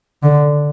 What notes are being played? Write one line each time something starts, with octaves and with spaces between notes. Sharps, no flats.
D3